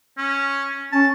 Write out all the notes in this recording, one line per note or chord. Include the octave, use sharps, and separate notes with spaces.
C#4
C#4 A5